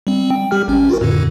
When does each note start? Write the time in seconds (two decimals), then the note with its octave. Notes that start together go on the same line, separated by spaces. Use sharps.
0.07 G3 C4
0.30 G5
0.51 G3 G4 F6
0.68 G#1 C#4
0.89 F4 F#4 A#4
1.01 F2 A2 D3